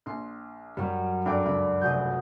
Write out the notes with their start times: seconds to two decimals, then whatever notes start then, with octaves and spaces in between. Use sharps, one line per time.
0.06 A#1 C6
0.77 F#2 G3 C#4 F#4 F5
1.25 G2 A4 D5 G5 D6
1.45 C#2 G2 B5
1.81 F1 F#4 G#4 D#5 G6